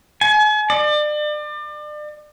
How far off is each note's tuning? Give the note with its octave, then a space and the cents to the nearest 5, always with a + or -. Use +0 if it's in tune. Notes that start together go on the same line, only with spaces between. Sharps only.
G#5 +40
D5 +35